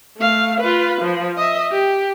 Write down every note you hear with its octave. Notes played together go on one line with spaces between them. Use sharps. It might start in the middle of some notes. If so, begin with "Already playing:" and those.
A3 F5
F4 B4
F3
D#5 E5
G4